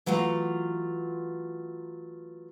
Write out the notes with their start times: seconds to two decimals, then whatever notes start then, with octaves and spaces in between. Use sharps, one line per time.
0.06 E3 F#3 A3 F4